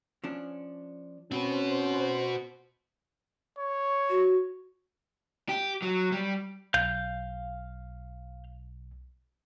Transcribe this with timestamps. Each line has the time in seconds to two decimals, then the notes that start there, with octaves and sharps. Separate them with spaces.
0.24 F3 C#4 D4
1.31 C4 C#4 F#4 B4 C5
3.59 C#5
4.10 F#4
5.49 G4
5.82 F#3
6.12 G3
6.74 B1 F5 G6